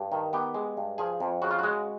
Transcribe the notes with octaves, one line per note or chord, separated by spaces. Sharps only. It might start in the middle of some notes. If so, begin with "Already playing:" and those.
Already playing: G2
D#3
B3 G4
G#3
G2
F3 G#4
F2
C#3 F#4
F4
G#3 F#4